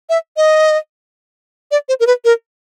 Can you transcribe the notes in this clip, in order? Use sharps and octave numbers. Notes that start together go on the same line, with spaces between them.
E5
D#5
D5
C5
A#4
B4
A#4